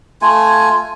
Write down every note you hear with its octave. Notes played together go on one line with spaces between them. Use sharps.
A3 F4 G#5